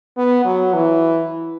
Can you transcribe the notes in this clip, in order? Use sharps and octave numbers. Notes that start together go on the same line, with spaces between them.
B3
F#3
E3